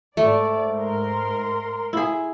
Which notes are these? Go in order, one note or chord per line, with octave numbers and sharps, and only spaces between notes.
G#2 A3 D5
A#4 C6
E4 G#4